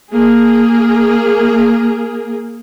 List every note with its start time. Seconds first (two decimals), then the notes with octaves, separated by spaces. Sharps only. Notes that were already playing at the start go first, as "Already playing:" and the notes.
0.12 A#3 G#4